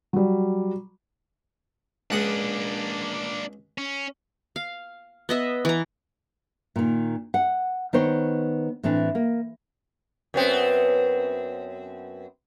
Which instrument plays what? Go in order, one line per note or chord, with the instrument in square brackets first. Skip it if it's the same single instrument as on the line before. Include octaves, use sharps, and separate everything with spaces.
[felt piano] F#3 G3
[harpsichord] C#2 F#5 D#6 [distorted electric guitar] A#3 D4
[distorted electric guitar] C#4
[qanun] F5
B3 D#5 E5
E3 A#5
[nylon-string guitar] A#2 D#3
F#5
D#3 B3 C5 C#5
A2 E3 C4 D4
A#3
[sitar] F#2 B3 C4